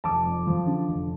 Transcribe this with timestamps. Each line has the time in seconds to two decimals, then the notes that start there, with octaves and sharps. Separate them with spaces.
0.04 F1 A5 D6
0.25 F2
0.47 F3
0.67 D3
0.89 F1